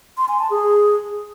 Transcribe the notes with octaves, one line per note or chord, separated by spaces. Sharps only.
C6
G#5
A5
G#4